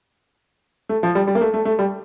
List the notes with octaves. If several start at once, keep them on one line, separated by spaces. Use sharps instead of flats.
A3
F3
G3
G3
A#3
A3
A3
A3
G3